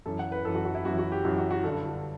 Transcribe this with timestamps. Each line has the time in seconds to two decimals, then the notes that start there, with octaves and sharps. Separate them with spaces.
0.06 F#2 E3 A4
0.19 F#5
0.32 B4
0.45 F#2 E3 A4
0.55 F#4
0.65 F#4
0.75 E4
0.85 F#2 F#4
0.88 E3
0.98 F#4
1.12 G4
1.24 F#2 E3 F#4
1.38 F#4
1.51 F#4
1.64 G2 D3 A4